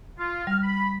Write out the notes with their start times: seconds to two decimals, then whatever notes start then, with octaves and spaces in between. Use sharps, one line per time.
0.19 F4
0.47 G3 F6
0.63 B5